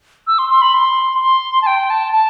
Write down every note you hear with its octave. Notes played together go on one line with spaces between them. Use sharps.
E6
C6
C6
B5
C6
C6
A5
G5
A5
A5